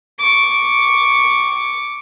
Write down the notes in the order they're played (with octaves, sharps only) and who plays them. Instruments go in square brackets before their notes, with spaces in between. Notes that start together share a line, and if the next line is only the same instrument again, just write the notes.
[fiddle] C#6 D6